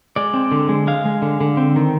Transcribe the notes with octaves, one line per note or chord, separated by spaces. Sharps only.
G#3 D5
C4
D3
G#3
G#3 F5
G#3
D3
D3
C4
D#3